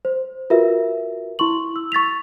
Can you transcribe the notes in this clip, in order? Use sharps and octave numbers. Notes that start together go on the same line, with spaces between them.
C5
F4 F#4 A#4 B4 E5
E4 C6 C#6 F#7
E6
C#6 A6 B6 F7